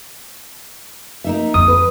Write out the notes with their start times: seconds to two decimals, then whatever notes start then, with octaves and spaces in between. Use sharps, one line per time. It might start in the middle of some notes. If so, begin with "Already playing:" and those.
1.24 A#3 D#4 E5
1.54 F2 D#6
1.68 B4